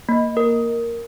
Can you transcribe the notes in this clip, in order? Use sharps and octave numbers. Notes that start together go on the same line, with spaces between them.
A#3
A#4